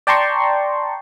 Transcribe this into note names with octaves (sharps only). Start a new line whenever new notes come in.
D5 G5 A5 A#5 C6 C#6